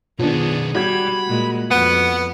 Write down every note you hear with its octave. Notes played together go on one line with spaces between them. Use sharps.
B2 D#3 F3 B3 D4 G#4
G3 F#4 B5 G6 G#6
A#2 G#3
F2 B3 F#5